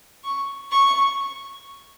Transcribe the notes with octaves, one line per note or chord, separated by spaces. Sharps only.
C#6
C#6